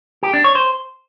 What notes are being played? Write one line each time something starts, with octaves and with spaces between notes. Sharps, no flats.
G4
D4
C#5
C5